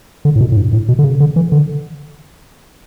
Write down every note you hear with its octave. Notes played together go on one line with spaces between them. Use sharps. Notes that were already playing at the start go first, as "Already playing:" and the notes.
D3
A2
B2
A2
G2
A2
B2
D3
C#3
D3
E3
D3